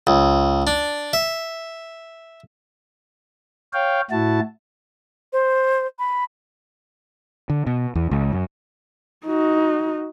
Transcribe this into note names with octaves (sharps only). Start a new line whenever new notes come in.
C#2
D4
E5
C#5 F5 G5
A2 E4 F#4 A5
C5
B5
D3
B2
E2
C#2
F#2
D#4 F#4